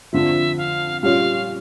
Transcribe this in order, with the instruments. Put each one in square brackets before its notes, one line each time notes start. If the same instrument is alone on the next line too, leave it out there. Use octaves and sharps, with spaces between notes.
[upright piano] F2 D3 F3 [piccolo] E5
[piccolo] F5
[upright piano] A#2 G3 C#4 F4 [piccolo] F5